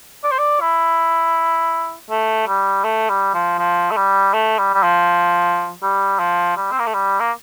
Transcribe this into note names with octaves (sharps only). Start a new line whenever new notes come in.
D5
C5
D5
E4
A3
G3
A3
G3
F3
F3
A3
G3
A3
G3
G3
F3
G3
F3
G3
C4
A#3
A3
G3
A#3